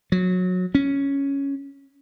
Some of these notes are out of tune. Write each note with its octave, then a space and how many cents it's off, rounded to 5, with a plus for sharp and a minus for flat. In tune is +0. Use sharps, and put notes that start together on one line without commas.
F#3 -20
C#4 +0